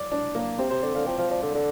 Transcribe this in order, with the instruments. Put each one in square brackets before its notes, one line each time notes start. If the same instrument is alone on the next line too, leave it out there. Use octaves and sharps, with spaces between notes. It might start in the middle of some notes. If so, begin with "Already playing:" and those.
Already playing: [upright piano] D5
D4
A#3
[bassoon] C3 [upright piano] C4
[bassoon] C3 [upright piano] C5
[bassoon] D3 [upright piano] D5
[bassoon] D3 [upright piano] F5
[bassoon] F3 [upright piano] G5
[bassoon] F3 [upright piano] F5
[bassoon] F3 [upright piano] D5
[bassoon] D3 [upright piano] D5
[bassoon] D3